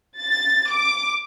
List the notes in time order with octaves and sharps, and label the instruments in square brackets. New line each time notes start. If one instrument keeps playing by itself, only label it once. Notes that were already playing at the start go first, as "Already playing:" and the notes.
[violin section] A6
D6